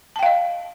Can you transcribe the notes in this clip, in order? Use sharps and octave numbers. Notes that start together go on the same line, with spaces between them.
D#5 F5 G5 A5